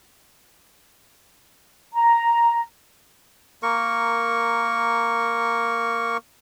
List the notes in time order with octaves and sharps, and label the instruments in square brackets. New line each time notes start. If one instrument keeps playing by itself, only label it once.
[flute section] A#5
[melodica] A#3 A#4 C#6